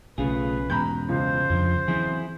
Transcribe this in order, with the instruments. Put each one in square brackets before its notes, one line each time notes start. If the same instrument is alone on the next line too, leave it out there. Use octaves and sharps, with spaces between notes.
[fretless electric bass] B1 [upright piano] C#3 [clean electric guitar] A3 F4 G#4 [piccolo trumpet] B4
[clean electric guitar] E2 G#2 B2 [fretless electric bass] C#4 [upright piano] A#5 B5 G6
[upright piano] C#2 [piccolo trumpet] C5
[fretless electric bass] F2 [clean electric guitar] D3 F3
[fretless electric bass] E3 F#3 C4 [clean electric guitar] E4 G#4